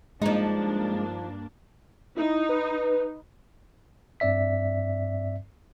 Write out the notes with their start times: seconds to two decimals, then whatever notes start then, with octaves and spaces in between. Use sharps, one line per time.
0.22 G2 F3 G#3 A#3 D4 D#4
2.17 D#4 E4
2.49 B4
4.20 G2 C4 D5 E5 B6